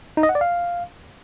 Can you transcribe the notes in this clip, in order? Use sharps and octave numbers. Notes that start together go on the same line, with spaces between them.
D#4
D#5
F#5
D5
F5